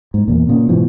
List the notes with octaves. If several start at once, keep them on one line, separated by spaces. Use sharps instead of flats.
G#2
E2 A#2
A#2 C#3
G#2 B2 E3 F3